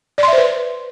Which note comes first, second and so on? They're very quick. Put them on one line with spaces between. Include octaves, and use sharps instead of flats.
D5 C6 E5 C5 B4